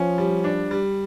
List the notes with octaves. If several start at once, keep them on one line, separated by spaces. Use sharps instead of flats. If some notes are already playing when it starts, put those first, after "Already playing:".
Already playing: F3 C#4
G3
D4
G3